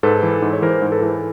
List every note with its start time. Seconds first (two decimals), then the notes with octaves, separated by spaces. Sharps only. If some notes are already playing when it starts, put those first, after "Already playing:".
0.03 G#2 A4 B4
0.23 E3
0.42 G#2
0.53 C#5
0.62 E3 A#4 C5
0.82 G#2
0.92 A4 B4
1.02 E3